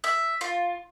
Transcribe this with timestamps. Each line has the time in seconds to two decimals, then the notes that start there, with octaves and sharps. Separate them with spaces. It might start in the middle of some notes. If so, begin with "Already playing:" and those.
0.04 E5
0.41 F4